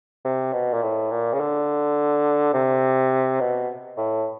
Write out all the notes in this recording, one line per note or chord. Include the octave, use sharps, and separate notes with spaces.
C3
B2
A#2
A2
A#2
C#3
D3
C3
B2
A2